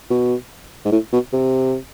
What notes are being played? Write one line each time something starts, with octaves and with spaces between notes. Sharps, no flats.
B2
G#2
A2
B2
C3